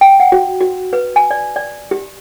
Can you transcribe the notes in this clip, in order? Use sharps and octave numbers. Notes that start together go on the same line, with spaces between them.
G5
F#5
F#4
F#4
B4
G#5
D5
D5
G4